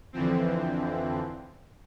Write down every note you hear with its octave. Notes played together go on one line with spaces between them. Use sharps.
F2 D3 E3 F3 C4